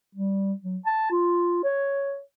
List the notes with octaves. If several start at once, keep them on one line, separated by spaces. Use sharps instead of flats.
G3
F#3
A5
F4
C#5